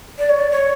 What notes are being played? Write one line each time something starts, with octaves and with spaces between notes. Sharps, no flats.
D5
C#5
D5
C#5